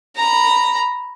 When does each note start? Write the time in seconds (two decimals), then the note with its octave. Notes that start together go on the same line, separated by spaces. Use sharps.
0.17 A#5 B5